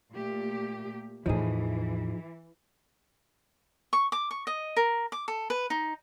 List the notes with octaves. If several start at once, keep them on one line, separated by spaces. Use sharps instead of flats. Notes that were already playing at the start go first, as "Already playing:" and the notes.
A#2 A3 G4
E2 A2 E3 F3 D#4 G#4
C#6
D6
C#6
D#5
A#4
D6
A4
B4
D#4